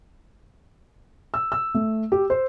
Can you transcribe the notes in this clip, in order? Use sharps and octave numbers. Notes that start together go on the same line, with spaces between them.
E6
E6
A3
G4
C5